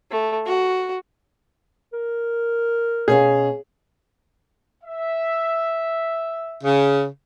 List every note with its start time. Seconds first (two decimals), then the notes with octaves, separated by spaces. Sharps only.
0.11 A3
0.46 F#4
1.93 A#4
3.08 B2 C#4 G#4 F5
4.83 E5
6.64 C#3